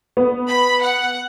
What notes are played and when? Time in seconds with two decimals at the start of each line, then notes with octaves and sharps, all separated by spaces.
0.17 B3
0.47 B5
0.80 F#5